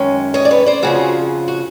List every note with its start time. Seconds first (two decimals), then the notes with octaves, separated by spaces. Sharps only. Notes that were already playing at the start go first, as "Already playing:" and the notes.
Already playing: F#2 D#3 G#3 C#4
0.34 C#5 D#5
0.45 D5
0.51 B4 C#5
0.66 C5 D5
0.82 F2 C#3 F3 F#4 G#4
1.48 F#4